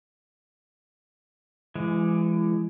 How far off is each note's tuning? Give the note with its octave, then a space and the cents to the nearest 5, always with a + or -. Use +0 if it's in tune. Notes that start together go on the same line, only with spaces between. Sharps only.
E3 +35 G#3 +0